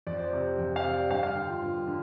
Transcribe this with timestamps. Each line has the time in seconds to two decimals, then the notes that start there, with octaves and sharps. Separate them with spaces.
0.07 F2 D5
0.18 C5
0.24 D5
0.33 C3
0.58 F2 G5
0.76 F5
0.84 C3
0.93 D5
1.10 G2 F5
1.23 F5
1.35 D3 G5
1.49 F4
1.62 G2
1.87 D3